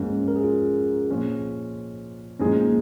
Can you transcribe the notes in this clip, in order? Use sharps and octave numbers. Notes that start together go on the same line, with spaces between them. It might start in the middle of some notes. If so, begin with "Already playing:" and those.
Already playing: G#2 F3 A#3 C#4
A#4
G#4
F4
A#2 F3 C#4 F4 G#4
A#2 F3 G#3 C#4 D#4 G#4
A#3